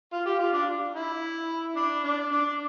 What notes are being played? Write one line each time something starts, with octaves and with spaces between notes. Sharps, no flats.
F4
G4
F4
D4
E4
D4
D4
D4